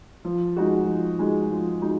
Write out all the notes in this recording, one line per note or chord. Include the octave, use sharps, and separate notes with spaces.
F3
G#3 D#4 F#4
F3
G#3 D#4 F#4
F3
G#3 D#4 F#4